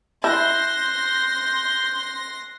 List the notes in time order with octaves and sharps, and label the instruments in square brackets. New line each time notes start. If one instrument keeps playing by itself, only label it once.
[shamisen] E4 [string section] C6 A#6 [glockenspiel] F#6 E7 [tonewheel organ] G6